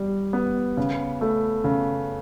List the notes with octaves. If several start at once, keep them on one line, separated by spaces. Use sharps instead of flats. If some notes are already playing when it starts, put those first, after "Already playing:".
Already playing: G3
B3
C#3
A3
C#3